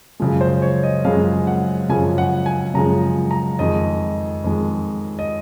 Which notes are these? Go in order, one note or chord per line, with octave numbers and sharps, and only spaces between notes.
F#2 C#3 F3 G#3
C5
C#5
D#5
F#2 C#3 F3 G#3 F5
F#5
F#2 C#3 F3 G#3 G#5
F#5
G#5
F#2 C#3 F3 G#3 A#5
A#5
F2 D#3 G#3 D#5
F2 D#3 G#3
D#5